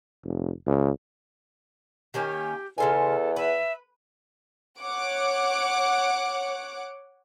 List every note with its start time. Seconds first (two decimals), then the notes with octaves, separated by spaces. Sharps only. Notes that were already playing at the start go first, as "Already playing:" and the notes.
0.24 F1
0.66 C#2
2.14 D#3 A#3 C#4 G4
2.78 E2 C#3 F4 A4 G#5
3.36 B4 E5
4.79 C#5 F#5 D6